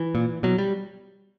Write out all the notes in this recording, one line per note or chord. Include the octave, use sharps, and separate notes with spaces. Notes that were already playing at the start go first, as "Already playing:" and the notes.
Already playing: E3
A#2
B2 F#3
G3